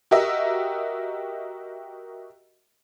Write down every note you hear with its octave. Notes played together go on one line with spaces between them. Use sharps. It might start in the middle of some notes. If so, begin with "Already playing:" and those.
F#4 G4 A#4 D#5 E5